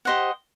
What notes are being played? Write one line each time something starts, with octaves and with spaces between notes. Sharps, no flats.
G4 C5 D#5 F#5